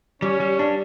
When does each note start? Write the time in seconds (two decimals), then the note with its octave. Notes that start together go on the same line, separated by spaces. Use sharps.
0.22 G3 C#4
0.40 G3
0.59 D4